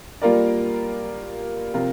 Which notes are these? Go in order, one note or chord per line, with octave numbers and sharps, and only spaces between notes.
G3 A#3 F4 A#4 D5
C3 F3 C4 F4 A#4